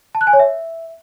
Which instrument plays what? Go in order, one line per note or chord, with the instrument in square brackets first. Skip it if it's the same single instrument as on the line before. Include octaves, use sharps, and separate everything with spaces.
[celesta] A5
F#6
G#5
C#5
E5